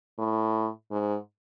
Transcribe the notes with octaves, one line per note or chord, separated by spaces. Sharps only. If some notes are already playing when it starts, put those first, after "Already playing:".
A2
G#2